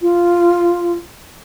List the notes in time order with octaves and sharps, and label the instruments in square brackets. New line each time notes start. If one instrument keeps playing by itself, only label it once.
[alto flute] F4